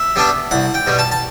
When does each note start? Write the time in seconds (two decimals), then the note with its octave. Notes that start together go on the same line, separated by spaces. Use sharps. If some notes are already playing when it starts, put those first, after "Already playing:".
Already playing: E5
0.16 G3 B3 D4
0.51 C2 F#5
0.74 G5
0.87 B2 G3
0.99 A5
1.12 A5